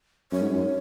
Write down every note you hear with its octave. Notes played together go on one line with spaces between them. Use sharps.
F#2 C#5
G#2
F#2